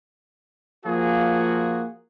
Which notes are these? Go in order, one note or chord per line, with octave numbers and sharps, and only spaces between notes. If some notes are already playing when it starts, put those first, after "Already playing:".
F3 A#3 F4 F#4 G#4